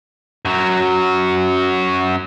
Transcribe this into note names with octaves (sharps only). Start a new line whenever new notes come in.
F#2 F#3